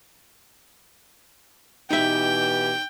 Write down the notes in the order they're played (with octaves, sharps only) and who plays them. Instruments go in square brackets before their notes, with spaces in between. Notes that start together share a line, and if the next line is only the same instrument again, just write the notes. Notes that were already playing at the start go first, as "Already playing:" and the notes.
[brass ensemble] B2 E3 G4 [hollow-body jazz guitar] D#4 E5 [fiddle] G5